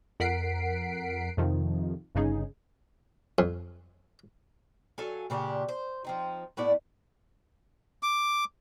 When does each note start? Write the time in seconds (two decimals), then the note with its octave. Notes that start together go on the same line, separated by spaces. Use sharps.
0.20 F2 A#4 F#5 B6 C7 D7
1.37 F2 C3 D#3 F3
2.15 G1 G2 C#3 D#4 G#4
3.39 F2
4.98 F#3 A4 F5 G#5
5.30 A#2 C#3 D4 G4
5.69 C5
6.05 F3 C4 D#4
6.57 A2 B3 E4 D5
8.03 D6